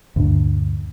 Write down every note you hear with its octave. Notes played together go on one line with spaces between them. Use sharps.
D2 G2 A#2 D4